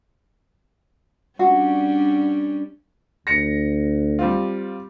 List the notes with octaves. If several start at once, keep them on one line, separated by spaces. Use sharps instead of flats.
G3 C#4 D4 F#4
D2 A#6 C#7
G3 C4 F4